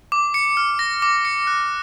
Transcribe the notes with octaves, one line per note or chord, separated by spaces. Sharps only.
D6
C#7
F6
A#6
D6
C#7
F#6